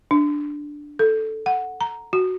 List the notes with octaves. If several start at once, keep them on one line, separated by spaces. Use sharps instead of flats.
D4
A4
F#5
A#5
F#4